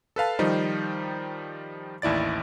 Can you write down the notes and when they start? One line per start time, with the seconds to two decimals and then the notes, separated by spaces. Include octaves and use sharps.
0.16 A4 B4 F5 A5
0.39 D#3 F3 G3 D#4 C5
2.02 A1 D#2 E4 D5 A6